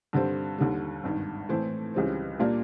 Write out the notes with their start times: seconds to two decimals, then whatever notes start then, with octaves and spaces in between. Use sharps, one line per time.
0.13 G2 D3 G3 C4
0.58 D#2 D3 G3
1.04 G#1 G2 D#3
1.49 A2 E3 A3 C4
1.94 C#2 C#3 E3 G3 C4
2.40 A#2 G3 A#3 D4 F4